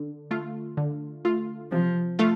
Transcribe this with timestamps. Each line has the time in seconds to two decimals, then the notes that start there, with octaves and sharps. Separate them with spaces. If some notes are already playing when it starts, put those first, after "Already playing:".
Already playing: D3
0.31 A3 F4
0.77 D3
1.25 A3 F4
1.72 C3 F3
2.19 A3 F4